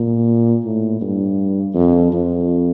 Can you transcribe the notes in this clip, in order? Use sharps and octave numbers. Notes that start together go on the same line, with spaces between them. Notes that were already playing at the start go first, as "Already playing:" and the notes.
Already playing: A#2
A2
G2
F2
F2